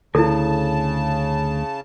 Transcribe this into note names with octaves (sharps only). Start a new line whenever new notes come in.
D2 C#3 E4 A4 A5